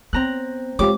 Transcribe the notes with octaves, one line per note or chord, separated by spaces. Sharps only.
B3 C4 A#5 F#6
G#3 F4 G4 C#5 D6